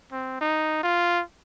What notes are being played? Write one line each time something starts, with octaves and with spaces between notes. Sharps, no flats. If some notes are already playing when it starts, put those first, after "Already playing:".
C4
D#4
F4